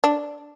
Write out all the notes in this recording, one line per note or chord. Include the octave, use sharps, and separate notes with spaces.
D4